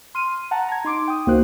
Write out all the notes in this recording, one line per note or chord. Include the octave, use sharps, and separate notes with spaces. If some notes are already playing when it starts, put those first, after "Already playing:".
C6 F6 D#7
F#5 A5 A#5
A#5 G#6
D#4 C6 D6 D7
G5 D#6
C#2 A#3 D#4 F#4 C5 F#6